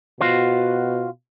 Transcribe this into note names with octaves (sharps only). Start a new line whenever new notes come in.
B2 F4 F#4 C5